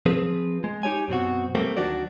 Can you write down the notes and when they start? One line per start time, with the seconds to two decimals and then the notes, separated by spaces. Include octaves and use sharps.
0.06 F3 C4 G#4 B4
0.64 G#3
0.83 D#4 G4 C#5 G#5
1.08 F#2 B2 C4 F#4
1.55 G3 A3 A#3 C4
1.77 D2 D#3 F#3 D4 F#4 D5